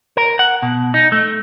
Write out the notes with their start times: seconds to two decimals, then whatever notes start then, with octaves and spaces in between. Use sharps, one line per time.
0.17 A#4
0.39 F#5
0.63 B2
0.94 D#4
1.12 A3